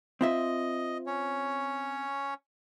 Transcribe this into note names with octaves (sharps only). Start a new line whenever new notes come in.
C4 F4 D#5 E5
C#4 C#5